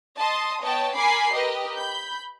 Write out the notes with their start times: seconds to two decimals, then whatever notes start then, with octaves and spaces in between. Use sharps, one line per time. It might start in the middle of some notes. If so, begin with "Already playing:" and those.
0.18 D#5 A5 C6 D#6
0.62 B3 C#5 D#5 G5 A5
0.97 A#4 G#5 B5 D6 C7
1.33 G4 A#4 B4 D#5
1.77 B5 G6